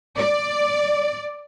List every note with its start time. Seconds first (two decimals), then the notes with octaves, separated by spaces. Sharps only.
0.17 D5